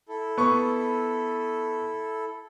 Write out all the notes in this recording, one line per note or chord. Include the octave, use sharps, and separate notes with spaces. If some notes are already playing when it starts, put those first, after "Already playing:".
E4 A4
B3 C#6